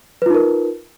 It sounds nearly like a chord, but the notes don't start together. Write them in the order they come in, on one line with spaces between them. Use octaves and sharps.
B4 F4 D#4 A#4